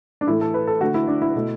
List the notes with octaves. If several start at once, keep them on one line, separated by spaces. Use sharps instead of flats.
D4
A2 E3 A3 E4
A4
B4
A4
D3 A3 F#4
E4
D4
E4
B2 A3